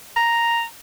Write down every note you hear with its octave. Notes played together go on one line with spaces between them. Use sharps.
A#5